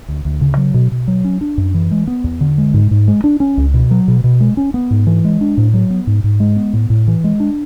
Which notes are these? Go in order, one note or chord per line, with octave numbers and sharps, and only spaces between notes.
D2
D2
C#3
F#3
B2
B2
F#3
C#4
D4
F#2
E3
G#3
B3
E2
D3
G#3
G#2
G#2
G#3
D4
C#4
C#2
B2
F#3
B2
B2
G#3
C#4
B3
G#2
E3
G#3
D4
A2
F#3
B3
G#2
G#2
G#3
B3
A2
A2
E3
G#3
D4